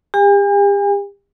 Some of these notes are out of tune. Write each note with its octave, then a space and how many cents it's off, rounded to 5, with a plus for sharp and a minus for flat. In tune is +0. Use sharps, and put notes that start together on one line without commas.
G4 +40 G#5 -40